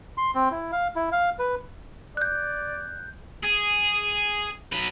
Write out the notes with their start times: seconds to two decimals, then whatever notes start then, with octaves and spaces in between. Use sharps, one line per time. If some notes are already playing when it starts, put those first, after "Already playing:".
0.17 C6
0.35 C4
0.51 E4
0.72 F5
0.96 E4
1.12 F5
1.39 B4
2.17 D5 F#6 G6
3.44 G#4
4.73 F#3 B4